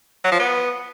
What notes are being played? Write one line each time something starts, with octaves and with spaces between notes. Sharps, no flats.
F#3
F3
B3